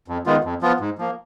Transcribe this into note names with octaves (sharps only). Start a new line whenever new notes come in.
F2
D#3 G#3 B3 F4
F2
F3 B3 F4
G#2
F3 A#3